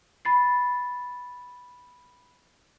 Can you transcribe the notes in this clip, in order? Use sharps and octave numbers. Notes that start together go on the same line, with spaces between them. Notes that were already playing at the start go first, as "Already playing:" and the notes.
B5 A6 C7